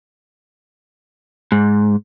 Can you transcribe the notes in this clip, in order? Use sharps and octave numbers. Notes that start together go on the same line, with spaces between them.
G#2